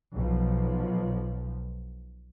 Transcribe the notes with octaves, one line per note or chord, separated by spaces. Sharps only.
B1 F3